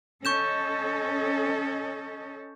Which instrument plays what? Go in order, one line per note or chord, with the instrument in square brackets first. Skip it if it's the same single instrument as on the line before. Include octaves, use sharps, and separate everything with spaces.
[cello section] C#4 A4 D#5 [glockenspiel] C#6 G6 E7